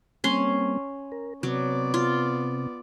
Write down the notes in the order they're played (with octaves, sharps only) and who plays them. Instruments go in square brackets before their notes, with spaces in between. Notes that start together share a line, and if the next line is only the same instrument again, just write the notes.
[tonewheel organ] G3 A#3 C4 [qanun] C#4 C6
[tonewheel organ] A#4
[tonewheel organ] C3 C4 [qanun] F#3 [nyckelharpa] B3 D5
[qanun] F4